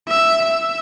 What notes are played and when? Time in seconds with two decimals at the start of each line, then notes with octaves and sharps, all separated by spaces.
0.09 E5
0.44 E5